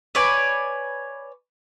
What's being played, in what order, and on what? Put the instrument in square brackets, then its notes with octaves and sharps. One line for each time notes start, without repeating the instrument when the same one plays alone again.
[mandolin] B4 C#5 D5 G#5